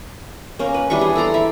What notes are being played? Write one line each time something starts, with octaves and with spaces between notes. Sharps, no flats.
A#3 C#4 A#4
B4
E3 G3 D4 C#6
G#4
A4 D5 A#5 C6
E4